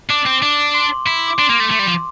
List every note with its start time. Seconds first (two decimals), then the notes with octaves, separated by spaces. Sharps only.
0.09 D4 D6
0.26 C4
0.42 D4 D6
0.74 C6
1.06 E4
1.28 D6
1.38 D4 C6
1.49 A#3
1.60 A3
1.71 A3
1.79 G3
1.87 F3